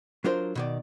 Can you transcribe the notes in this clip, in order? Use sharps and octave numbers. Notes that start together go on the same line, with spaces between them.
F#3 D4 F4 A#4 C5
B2 D#3 D5